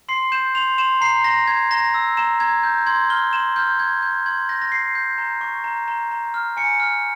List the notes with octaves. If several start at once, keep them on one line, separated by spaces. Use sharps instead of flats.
C6 C7
G6 E7
C6 F7
C6 E7
A#5 C7
A#5 A#6
A#5 G#6
A#5 A#6
E6
A#5 E7
A#5 G#6
G6
C6 G#6
F6 G7
C6 E7
F6 G6
G6 G#6
G6
C6 G#6
G6 A#6
A#6
G6 C7
G6
A#5
C#6
A#5
A#5
A#5
F6
G#5 C#7
F6